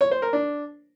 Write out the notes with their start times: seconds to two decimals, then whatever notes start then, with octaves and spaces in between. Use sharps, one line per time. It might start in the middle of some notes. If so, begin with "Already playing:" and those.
0.01 C#5
0.11 C5
0.22 A#4
0.33 D4